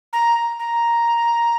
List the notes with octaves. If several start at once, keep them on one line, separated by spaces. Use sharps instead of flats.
A#5
A#5